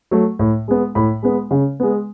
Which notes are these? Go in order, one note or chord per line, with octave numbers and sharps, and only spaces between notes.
F#3 A3
A2
G#3 B3
A2 B5
G#3 B3
C#3
G#3 B3